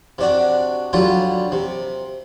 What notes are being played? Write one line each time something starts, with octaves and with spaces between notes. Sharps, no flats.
C3 D4 F#4
D3 F#3 G3 F4
C3